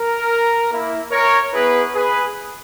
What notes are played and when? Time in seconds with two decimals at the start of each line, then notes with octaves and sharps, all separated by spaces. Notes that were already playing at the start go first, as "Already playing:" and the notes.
Already playing: A#4
0.70 A#3 E4
1.11 A#4 C#5
1.52 B3 E4 G#4 B4
1.95 G#4 B4